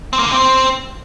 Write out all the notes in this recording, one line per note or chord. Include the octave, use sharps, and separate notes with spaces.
C4
A#3
D3
C4